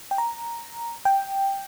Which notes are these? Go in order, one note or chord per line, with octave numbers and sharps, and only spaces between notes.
G5
A#5
G5